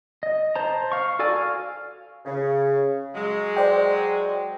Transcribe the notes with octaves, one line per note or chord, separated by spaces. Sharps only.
D#5
C5 A5 A#5
F5 C#6
F#4 A4 D5 G#5
F5
C#3
F#3 G#3
C5 D5 G5